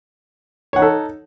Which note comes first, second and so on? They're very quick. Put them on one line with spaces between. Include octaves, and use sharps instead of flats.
C#5 F#5 D#4 A4